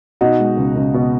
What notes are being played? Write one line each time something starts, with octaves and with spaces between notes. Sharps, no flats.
B2 D#4 F#4
G#3
C#2
C#2
B2